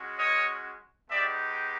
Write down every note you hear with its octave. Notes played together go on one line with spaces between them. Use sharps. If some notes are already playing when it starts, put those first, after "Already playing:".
Already playing: G#3 C#4 F#4
C#5 D#5
G#3 B3 D#4 G4 D5 E5